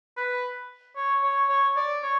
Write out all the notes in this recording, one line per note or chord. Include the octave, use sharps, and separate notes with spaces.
B4
C#5
C#5
C#5
D5
C#5